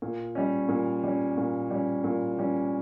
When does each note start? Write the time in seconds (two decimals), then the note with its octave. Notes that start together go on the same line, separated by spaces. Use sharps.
0.02 A#2
0.35 G3 C#4
0.69 A#2
1.04 G3 C#4
1.37 A#2
1.71 G3 C#4
2.04 A#2
2.39 G3 C#4